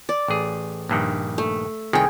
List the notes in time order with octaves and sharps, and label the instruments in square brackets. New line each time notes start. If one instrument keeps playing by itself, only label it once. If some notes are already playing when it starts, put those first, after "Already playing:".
[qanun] D5
[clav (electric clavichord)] A1 G#4
A#1 G2 D#3
[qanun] A3
[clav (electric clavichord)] C2 D#3 [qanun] G#4 G5